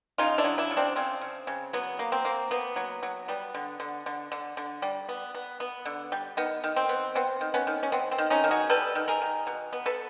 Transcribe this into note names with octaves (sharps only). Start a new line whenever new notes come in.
C#3 D#4 F4
D4 E4
F#3
D4 E4
C#3
C4 D4
C#3 C4
C#3
C#3
F#3 B3
A#3
C4
A#3
A#3 B3
F#3
F#3
G3 B3
D3
D3
D3
D3
D3
G3
B3
B3
B3
D3
G3
D#3 B3
D#3
C4
B3
B3 C4
D#3
B3 C#4
D#3
C#4
B3 C4
C4
D#3
C#4 D#4
D#3
F#4 G#4
G3 A4 B4
D#3
G#4 A#4
D#3
B2
B3
A4 B4